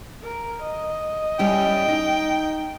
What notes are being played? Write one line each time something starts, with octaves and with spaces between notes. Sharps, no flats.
A#4
D#5
G3 C#4 E4 G5
D#4